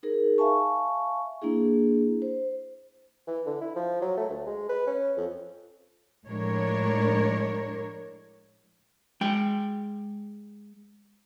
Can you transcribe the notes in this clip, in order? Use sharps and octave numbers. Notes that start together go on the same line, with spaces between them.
D#4 G#4 A#4
E5 F5 G#5 A5 C#6
A#3 D4 E4 G#4
C5
E3
D3
E4
F3
F#3
A3
D2
G#3
B4
C#4
F2
A2 F3 G#3 D4 A#4 C#5
G#3 G5